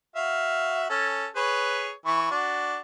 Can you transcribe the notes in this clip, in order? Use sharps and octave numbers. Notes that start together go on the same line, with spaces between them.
F#4 E5 F5
C#4 A4
G#4 B4 C#5
E3 B5 C#6
D4 F#4